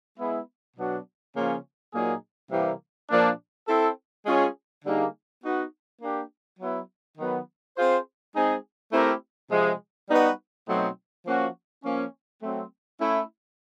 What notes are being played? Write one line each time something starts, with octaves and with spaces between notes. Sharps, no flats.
G#3 B3 E4
B2 F#3 B3 D4 F#4
C#3 F3 A#3 C#4 F4
A#2 F#3 A#3 D#4 G#4
C3 E3 G3 A#3
A#2 F3 A#3 D4
C4 E4 A4
G#3 C#4 F4 G#4 C#5
D3 G3 A#3 D#4 G#4
B3 D#4 F#4
A#3 D4 G4
F#3 B3 E4
D#3 F#3 B3
C4 F4 G#4 C5
G#3 C4 D#4 G#4
A3 C4 E4 G4 A#4
C3 F3 G#3
G3 B3 D#4 F#4 B4
B2 F#3 A3 C4 D#4
F3 A#3 C#4 F#4
F3 A#3 C#4
F#3 A3 C4
A3 C#4 E4